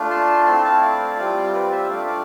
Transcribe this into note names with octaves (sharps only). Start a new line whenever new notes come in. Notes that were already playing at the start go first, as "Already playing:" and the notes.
Already playing: A3 D4 F4
A5 C6
A3 C4 E4 A5 C6
F5 A5
D5 F5
G3 C4 F4
B4 D5
C5 E5
A3 D4 F4 D5 F5
D5 F5